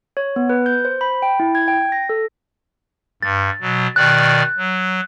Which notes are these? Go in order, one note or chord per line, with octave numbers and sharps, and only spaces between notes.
C#5
B3
B4
G6
C5
B5
G5
E4
G#6
G5
A#6
A4
G2 A6
B2 F#3
B2 D#3 D5 F#6
F#3